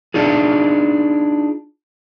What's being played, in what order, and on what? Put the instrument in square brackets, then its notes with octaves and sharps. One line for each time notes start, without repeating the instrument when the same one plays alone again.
[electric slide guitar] D4 D#4 F4 G#4